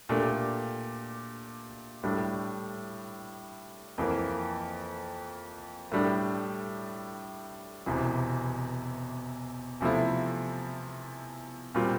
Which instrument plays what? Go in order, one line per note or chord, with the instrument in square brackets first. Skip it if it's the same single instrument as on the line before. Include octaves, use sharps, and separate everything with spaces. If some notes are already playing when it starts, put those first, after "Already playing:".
[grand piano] A#2 A3 D4 G4
A2 G3 D4
F2 E3 A#3
A2 G3 D4
E1 E2 C3 E3
E2 C3 F3 A3 E4
A#2 G3 C4 F4